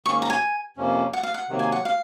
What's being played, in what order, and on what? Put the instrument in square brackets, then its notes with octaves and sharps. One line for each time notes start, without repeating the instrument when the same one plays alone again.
[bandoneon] G#2 D#3 A#3 C#4 [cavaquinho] C#6
[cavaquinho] A#5
G#5
[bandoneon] F2 C3 F3 A#3 C#4
[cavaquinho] F#5
F5
F#5
[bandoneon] C3 D#3 F#3 A#3
[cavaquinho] G#5
F#5
F5